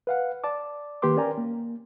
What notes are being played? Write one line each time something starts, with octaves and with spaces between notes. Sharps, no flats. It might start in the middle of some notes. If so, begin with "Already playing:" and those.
B4 F5 F#5
D5 A5 D6
D#3 A#3 G4 B4 C6 D6
C#4 A#4 D5 G5 G#5 A#5
A#3